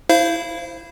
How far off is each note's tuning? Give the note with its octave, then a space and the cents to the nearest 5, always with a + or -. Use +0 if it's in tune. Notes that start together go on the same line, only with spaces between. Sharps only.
E4 -5 C5 +0 F5 -30